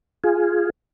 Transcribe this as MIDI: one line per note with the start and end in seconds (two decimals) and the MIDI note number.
0.24 0.70 65
0.24 0.70 68